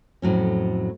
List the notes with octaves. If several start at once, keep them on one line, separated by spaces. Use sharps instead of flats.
F2 A2 F#3 C#4